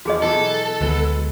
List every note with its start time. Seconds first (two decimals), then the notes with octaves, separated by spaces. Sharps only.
0.05 E2 F3 F#4 G#4 D#5
0.22 B2 E3 F#3 A4
0.81 D2 D#3 F#3 G#3 B3